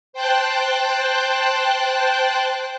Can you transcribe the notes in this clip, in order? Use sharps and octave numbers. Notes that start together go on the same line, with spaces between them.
C5 G5 A5 F#6